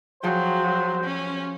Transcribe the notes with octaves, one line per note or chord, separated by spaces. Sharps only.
F3 F#3 G#4 C5 G5
C#4